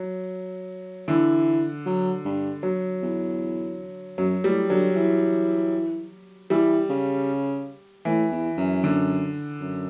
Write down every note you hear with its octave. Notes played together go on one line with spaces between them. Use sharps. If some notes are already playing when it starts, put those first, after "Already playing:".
Already playing: F#3
D3 E3
F#3
G2
F#3
E2
F#2 F#3
A2 G3
D3 F#3
E3
E3 G3
C#3
A2 E3
E2
F#2
D3
F#2